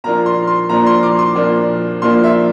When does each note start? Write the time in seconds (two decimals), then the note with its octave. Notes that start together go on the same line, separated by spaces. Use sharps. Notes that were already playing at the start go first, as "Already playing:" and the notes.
0.04 A#2 F3 A#3 D4 F4 A#5
0.26 C6
0.47 C6
0.69 A#2 F3 A#3 D4 F4 A#5
0.87 C6
1.03 D6
1.19 C6
1.35 A#2 F3 A#3 D4 F4
2.02 A#2 F3 A#3 D4 F4 C6
2.24 E5